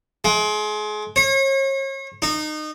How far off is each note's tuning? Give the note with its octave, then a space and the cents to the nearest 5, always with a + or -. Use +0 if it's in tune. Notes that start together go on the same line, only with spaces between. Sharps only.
G#3 +30
C#5 -40
D#4 -25